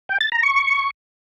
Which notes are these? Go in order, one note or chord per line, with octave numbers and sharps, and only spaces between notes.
G5
A6
A#5
C#6